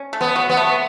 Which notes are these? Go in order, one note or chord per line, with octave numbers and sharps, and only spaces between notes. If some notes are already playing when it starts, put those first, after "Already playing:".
Already playing: C#4
A3
B3
F#4
B3
A3